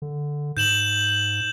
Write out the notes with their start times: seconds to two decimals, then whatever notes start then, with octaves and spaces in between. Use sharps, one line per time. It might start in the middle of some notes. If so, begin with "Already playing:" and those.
0.02 D3
0.57 G#2 G6 E7 F#7